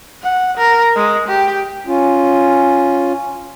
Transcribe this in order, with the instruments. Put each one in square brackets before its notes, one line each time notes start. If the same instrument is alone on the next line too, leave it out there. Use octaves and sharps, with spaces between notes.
[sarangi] F#5
A#4
G#3
G4
[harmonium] C#4 F4